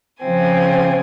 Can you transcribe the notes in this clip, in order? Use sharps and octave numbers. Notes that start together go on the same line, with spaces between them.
C#3 F3 C4 G#5